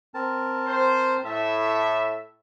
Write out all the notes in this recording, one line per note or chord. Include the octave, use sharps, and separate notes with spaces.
C4 A#4 A5
C5
A2 E5 A5